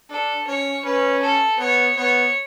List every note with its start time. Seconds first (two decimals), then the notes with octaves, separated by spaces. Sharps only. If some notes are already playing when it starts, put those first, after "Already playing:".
0.10 D4 A4
0.47 C#4 C#5
0.85 C#4 B4
1.22 A4
1.59 B3 C#5
1.97 B3 C#5